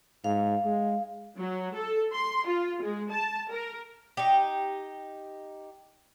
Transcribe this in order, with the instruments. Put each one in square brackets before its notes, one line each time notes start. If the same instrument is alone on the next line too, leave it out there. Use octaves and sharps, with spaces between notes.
[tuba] G#2 [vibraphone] F5
[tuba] G#3
[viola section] F#3
A4
C6
F4
G#3
A5
A#4
[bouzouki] D#4 G4